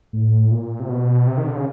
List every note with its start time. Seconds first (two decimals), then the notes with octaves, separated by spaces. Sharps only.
0.13 A2
0.51 A#2
0.80 C3
0.89 B2
1.27 C3
1.38 D#3
1.47 D3
1.56 C#3